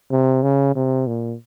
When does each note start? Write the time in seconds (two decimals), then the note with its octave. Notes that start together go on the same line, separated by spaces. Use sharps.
0.11 C3
0.43 C#3
0.75 C3
1.07 A#2